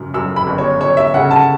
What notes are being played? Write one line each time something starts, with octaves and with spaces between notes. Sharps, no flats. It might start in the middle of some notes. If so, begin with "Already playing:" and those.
Already playing: F#2 C#3
F#2 E6
B5
G1
C#5
G1 C#5
E5
C#3 F#5
A5